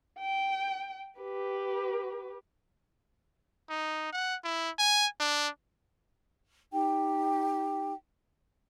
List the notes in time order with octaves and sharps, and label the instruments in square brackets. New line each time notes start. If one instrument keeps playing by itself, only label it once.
[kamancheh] G5
G4 B4
[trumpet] D#4
F#5
E4
G#5
D4
[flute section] D#4 G4 G5